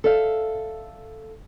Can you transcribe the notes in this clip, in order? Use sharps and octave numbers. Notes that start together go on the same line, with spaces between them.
A4 D5 E5 F5